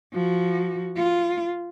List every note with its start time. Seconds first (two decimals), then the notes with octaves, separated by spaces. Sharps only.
0.13 F3 F#4
0.96 F4